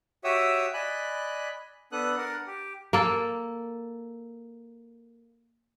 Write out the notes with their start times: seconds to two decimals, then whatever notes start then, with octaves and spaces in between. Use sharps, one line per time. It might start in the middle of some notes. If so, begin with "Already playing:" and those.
0.24 F#4 G4 C#5 E5 D#6 E6
0.74 D5 D#5 G#5 B5 F#6
1.92 B3 D4 A4 D#6 F#6
2.17 D4 A#4 D5 F#5
2.47 G4
2.93 A#3 A4